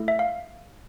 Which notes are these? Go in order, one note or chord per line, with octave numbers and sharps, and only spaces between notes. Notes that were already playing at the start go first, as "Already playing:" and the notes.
Already playing: A3 E4 A4
E5
F5